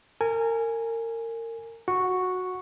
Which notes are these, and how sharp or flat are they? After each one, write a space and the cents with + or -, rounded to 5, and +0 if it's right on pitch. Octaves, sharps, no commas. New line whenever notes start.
A#4 -30 G#5 +0
F#4 -10 C#6 +0